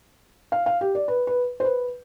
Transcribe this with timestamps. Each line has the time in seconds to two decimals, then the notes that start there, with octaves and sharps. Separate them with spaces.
0.52 F5
0.66 F5
0.81 G4
0.95 D5
1.08 B4
1.27 B4
1.60 C5
1.65 B4